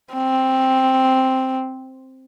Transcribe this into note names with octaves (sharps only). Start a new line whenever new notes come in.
C4